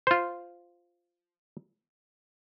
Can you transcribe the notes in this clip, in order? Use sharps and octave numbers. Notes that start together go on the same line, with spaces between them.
F4 C5